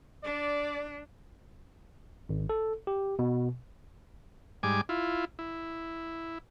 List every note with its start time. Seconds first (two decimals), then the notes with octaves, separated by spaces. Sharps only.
0.24 D4 D5
2.29 G#1
2.49 A4
2.87 G4
3.19 B2
4.63 G#2 G3 G#5 D6
4.89 E4 F4
5.39 E4